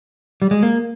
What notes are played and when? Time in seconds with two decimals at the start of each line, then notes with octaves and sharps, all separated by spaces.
0.42 G3
0.51 G#3
0.63 A#3